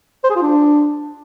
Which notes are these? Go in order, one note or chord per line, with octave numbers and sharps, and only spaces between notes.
C5
G#4
F4
D4